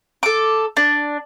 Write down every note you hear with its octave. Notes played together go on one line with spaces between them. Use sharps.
A4 D6
D4